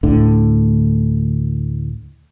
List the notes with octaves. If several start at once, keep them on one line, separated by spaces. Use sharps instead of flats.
D2 A2 D3